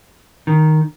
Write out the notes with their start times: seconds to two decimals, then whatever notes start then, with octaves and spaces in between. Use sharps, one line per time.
0.47 D#3